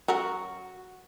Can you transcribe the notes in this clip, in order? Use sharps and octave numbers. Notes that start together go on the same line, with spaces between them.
F#3 C#4 F#4 A#4